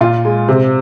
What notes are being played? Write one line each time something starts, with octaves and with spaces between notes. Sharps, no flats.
A#2 F4
G#3
C3